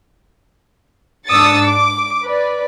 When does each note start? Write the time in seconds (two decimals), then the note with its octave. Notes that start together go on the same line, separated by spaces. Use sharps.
1.28 G#2 D4 D#6 E6 A6 C#7
1.65 D6
2.24 B4 D5